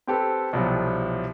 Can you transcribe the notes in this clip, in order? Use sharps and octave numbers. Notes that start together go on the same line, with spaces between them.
C4 G4 A4 B4
C2 B2 F3 F#3